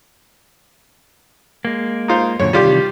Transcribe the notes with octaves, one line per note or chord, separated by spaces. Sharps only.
G#3 A#3
D#4 F4 C5
F#2 A#2 D3 C#5
C3 D#3 E3 G3 F4 G4